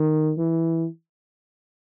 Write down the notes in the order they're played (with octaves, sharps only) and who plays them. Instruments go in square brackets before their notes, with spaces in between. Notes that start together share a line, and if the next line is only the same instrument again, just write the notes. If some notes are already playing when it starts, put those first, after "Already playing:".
Already playing: [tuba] D#3
E3